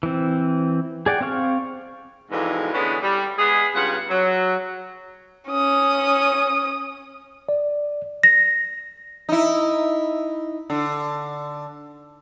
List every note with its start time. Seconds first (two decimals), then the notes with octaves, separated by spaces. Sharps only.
0.03 E3 C4
1.06 G#4 D5 F#5 G5
1.21 C4 C5 F5 C#6 F6
2.31 F2 G#2 B2 D3 E3
2.73 D3 E3 G#3 A3 B3 C#4
3.02 G3
3.37 G#3 B3 G#4
3.74 G2 C#3 B3 F4 F#5
4.09 F#3
5.49 C#4 D#6
7.49 D5
8.23 A#6
9.29 D#4 E4
10.70 D3